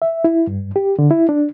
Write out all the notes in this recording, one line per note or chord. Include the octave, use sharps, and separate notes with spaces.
E5
E4
G2
G4
D3
E4
D4